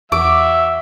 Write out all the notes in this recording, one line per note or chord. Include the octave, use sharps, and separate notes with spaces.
E2 F#3 E5 D6 E6